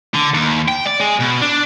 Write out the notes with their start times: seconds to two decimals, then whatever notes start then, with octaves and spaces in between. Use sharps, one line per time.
0.14 D3
0.34 D#2
0.68 G5
0.87 D5
1.00 G#3
1.20 B2
1.41 D4